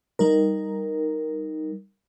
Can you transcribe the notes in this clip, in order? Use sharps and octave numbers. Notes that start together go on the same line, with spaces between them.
G3 D#4 A#4